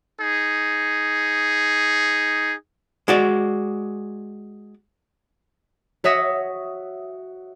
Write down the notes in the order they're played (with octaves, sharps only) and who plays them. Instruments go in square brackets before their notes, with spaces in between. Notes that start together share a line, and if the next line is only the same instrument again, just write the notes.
[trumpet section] D#4 G#4
[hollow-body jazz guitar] G#3 F#4 D5
[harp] F#4 C#5 E5 D#6 A#6